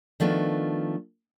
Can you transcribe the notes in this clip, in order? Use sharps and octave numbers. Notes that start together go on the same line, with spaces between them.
D#3 F3 A3 B3 D4